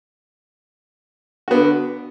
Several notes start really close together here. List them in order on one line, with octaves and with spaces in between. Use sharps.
F#4 B3 D3